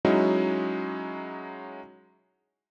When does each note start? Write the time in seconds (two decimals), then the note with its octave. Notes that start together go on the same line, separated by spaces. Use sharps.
0.05 F#3 G#3 C#4 D#4 E4 F#4